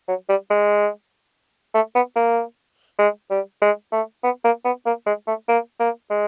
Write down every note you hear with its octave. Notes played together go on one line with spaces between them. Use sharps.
F#3
G3
G#3
A3
B3
A#3
G#3
G3
G#3
A3
B3
A#3
B3
A#3
G#3
A3
A#3
A#3
G#3